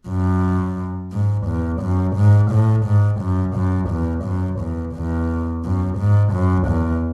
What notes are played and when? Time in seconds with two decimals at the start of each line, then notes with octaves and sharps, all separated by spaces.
0.09 F#2
1.13 G#2
1.47 E2
1.82 F#2
2.17 G#2
2.52 A2
2.86 G#2
3.21 F#2
3.56 F#2
3.90 E2
4.25 F#2
4.60 E2
4.95 E2
5.65 F#2
5.99 G#2
6.33 F#2
6.69 E2